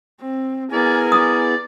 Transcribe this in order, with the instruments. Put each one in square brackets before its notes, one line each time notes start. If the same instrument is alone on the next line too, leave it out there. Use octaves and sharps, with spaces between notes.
[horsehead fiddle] C4
[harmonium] B3 E4 G#4 [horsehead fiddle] A#4 G#5 [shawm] D5
[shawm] D5 [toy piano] D#6